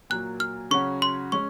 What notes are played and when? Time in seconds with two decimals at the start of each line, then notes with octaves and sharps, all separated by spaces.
0.10 A#2 F#3 A#3 F#6
0.40 F6
0.71 C#3 F#3 C#4 F#4 C#6
1.02 C6
1.32 G#3 C#4 C#6